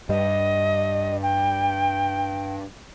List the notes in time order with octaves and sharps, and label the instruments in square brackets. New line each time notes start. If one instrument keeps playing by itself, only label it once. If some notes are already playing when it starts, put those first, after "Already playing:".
[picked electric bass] G2 G3 [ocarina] D#5
[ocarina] G5